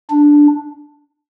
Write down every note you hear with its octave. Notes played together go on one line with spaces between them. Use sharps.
D4